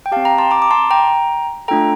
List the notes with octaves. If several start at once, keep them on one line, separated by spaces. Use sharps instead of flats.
G5
C4 G4 F5 A5
G5 A#5
A5 C6
A#5 D6
D6
A5 C6
G5 A#5
A3 D4 F4 A4 G5 A#5